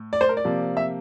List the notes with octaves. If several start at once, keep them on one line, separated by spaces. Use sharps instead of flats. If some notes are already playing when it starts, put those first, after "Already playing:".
Already playing: A2
D5
C5
A#4
D5
C3 F3 A#3
E5